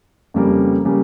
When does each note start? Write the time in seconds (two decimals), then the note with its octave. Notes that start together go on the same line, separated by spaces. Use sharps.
0.34 F2 C#3 G3 A#3
0.85 C#3 G3 A#3